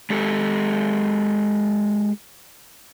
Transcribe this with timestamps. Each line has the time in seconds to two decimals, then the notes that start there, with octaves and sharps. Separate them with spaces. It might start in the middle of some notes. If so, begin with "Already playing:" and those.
0.10 G#3 G4 A4